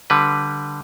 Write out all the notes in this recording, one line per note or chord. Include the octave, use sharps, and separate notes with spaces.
D3 G3 B4